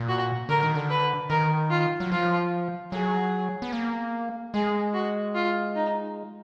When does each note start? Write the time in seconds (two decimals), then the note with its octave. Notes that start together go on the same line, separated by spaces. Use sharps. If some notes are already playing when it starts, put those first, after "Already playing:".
Already playing: A#2
0.09 F#4
0.49 D3 A#4
0.63 D#3
0.75 D3
0.90 B4
1.30 D#3 A#4
1.70 F4
2.00 F#3
2.11 F3 F4
2.92 F#3 G#4
3.62 B3
3.72 A#3
4.54 G#3 G#4
4.94 F#4
5.35 F4
5.75 D#4